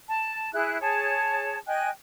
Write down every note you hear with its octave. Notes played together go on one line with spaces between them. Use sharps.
A5
E4 G#4 F#6
G#4 C#5 A5
D#5 G5 G#5 F#6